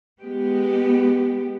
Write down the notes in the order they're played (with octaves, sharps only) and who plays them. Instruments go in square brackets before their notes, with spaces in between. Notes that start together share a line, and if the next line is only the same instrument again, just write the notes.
[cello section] G#3 B3 G4